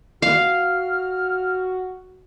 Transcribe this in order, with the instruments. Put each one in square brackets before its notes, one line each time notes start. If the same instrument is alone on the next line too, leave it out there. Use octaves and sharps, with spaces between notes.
[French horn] F#4 [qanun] F5 [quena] F6